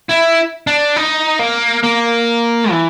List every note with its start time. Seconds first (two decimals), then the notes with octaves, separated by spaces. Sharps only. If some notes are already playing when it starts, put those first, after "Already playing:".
0.09 E4
0.67 D4
0.96 D#4
1.39 A#3
1.83 A#3
2.71 E3